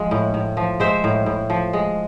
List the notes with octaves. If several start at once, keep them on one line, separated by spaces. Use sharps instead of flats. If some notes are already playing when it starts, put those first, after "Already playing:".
Already playing: F3 G#3
A2
A2
F3
G#3 C5 E5
A2
A2
F3
G#3